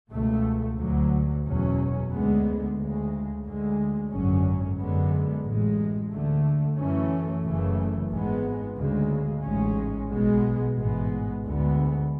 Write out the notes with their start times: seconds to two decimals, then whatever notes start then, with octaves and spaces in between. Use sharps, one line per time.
0.12 C#2 B2 A3
0.78 D2 D3 F#3
1.44 F#1 E2 B2 F#3 C#4
2.11 D2 D3 G#3 B3
2.78 D2 C#3 G#3
3.44 D2 D3 G#3
4.11 G#1 F#2 D3 F#3 C#4
4.77 F#2 D3 G#3 B3
5.44 A1 A2 G#3
6.11 D2 D3 A3
6.77 F#2 E3 A3 C#4
7.44 F#1 F#2 C#3 E3 A3
8.10 G#1 G#2 G#3 B3
8.77 D2 C#3 G#3
9.44 A1 G#2 G#3 C#4
10.10 B1 B2 G#3 B3
10.77 A1 G#2 G#3 B3
11.44 D2 D3 G#3 B3